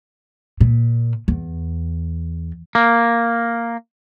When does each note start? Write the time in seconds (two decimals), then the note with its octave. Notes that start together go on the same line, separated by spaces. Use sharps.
0.61 A#2
1.28 E2
2.75 A#3